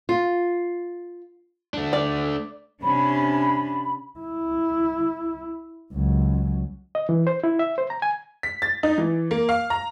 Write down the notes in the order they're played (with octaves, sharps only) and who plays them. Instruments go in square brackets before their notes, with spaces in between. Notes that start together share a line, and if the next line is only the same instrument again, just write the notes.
[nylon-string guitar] F4
[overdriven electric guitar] A3 D4
[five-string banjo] D5
[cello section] C3 C#4 D4 [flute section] B5
[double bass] E4
C#2 F#3
[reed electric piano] D#5
E3
C5
E4
E5
C5
A#5
G#5
[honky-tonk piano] B6
A6
D#4
E3
A#3
F5
A#5